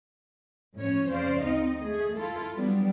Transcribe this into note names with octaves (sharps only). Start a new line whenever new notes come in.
A2 F3 C#4 C#5
F2 C#3 C#4 C5 D5 F5
D2 C4 D#4 D#5
A3 G#4
E4 F4 A4
F#3 G3 B3 D4